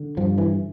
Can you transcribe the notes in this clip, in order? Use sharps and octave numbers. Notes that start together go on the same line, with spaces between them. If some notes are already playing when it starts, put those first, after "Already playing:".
Already playing: D3
G2 F3
E3